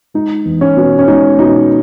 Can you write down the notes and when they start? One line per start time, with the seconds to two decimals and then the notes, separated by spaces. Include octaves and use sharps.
0.14 G#3 D#4
0.45 E2
0.61 C#4
0.77 B2
0.99 C#4
1.08 G#3 D#4
1.39 B2 D#4